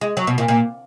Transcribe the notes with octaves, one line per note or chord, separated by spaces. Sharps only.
G#3
F#3
B2
A#2
A#2